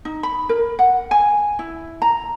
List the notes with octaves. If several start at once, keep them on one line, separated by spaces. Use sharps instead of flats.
D#4
B5
A#4
F#5
G#5
E4
A#5